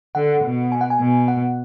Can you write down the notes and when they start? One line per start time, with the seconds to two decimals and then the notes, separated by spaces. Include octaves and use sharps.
0.15 D3 F#5
0.44 B2
0.72 G#5
0.81 F#5
0.90 G#5
0.99 B2
1.28 F#5